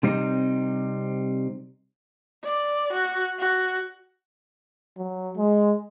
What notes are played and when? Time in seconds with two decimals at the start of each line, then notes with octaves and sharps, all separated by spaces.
0.03 C3 G3 C4 D#4
2.44 D5
2.93 F#4
3.39 F#4
4.97 F#3
5.37 G#3